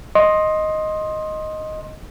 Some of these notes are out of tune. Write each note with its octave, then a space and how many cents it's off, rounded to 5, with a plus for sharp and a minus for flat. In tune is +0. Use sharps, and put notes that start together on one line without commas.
D#5 +0 C6 +20